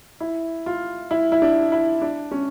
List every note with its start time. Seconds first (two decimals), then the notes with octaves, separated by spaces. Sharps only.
0.20 E4
0.66 F4
1.11 E4
1.32 E4
1.42 D4
1.72 E4
2.02 D4
2.31 C#4